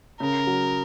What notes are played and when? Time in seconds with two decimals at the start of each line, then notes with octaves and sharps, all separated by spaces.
0.20 C#3 A#4
0.47 F#3